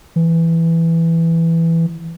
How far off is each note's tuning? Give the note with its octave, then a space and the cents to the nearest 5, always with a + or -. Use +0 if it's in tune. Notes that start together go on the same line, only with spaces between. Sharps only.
E3 +5